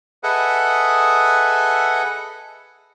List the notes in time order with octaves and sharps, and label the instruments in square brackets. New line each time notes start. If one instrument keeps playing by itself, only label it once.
[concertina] G#4 A4 B4 D#5 E5 F#5